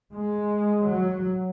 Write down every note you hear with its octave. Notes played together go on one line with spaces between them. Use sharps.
G#3
F#3